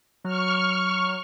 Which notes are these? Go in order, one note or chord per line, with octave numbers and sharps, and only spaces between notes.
F#3 C#6 F6